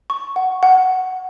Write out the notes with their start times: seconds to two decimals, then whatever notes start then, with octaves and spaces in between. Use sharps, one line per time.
0.10 C#6
0.36 F#5
0.63 F#5